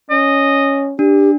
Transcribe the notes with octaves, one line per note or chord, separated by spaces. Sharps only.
C#4 D#5
D4 G4